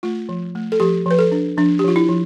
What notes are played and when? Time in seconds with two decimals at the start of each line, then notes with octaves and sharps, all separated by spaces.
0.03 A3 F4
0.29 F3
0.55 A3
0.72 A4
0.80 F3 G4
1.06 F3 B4
1.19 A4
1.32 D4
1.57 F3 D4
1.79 G4
1.84 F3 F4
1.96 E4
2.09 F3